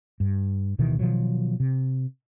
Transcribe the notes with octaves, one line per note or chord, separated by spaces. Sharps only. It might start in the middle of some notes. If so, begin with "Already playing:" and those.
G2
D1 B2 D#3 E3
B2 D#3 F3 F#3
C3